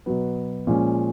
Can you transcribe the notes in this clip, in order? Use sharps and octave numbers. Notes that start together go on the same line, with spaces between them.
B2 F#3 B3
A#2 F3 G#3 C#4